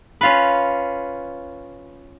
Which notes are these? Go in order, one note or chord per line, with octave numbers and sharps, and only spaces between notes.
C#4 F4 B4